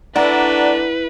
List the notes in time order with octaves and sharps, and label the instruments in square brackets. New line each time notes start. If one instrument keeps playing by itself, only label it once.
[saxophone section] A3 D4 [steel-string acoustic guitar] E4 [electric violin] B4 [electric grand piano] D5 F#5 A#5